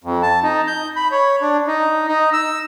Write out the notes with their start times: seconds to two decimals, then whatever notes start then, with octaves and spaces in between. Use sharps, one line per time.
0.04 F2
0.23 A5
0.43 D#4
0.67 G6
0.96 B5
1.11 C#5
1.41 D4
1.67 D#4
2.08 D#4
2.33 E6